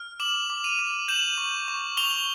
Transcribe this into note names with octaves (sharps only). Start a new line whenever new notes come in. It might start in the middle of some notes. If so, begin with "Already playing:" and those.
Already playing: F6
D6 E7 F#7
D6
D#7 F7
D6
G6 E7 F#7
C#6
C#6
C#6 F7 G7